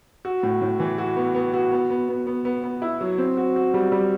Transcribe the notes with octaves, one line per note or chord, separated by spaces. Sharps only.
F#4
A2
A2
E3
F#4
B3
B3
F#4
B3
B3
B3
B3
B3
B3
E4
F#3
C4
F#4
F#4
G3
G3